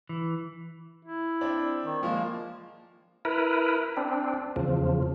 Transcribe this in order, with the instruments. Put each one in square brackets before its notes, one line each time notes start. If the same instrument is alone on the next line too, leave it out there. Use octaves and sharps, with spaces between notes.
[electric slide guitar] E3
[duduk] E4
[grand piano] C4 D4
[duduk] D#3
[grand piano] F3 A#3 [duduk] G#3
[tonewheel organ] E4 A#4 B4
C4 D4
E2 C#3 F3